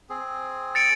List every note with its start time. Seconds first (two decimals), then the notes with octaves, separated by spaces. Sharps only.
0.09 C4 G#4
0.75 A6 C#7 D7